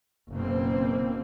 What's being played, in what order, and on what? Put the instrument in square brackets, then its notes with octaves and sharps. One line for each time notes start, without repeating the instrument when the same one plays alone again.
[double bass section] F#1 B2 A#3 C4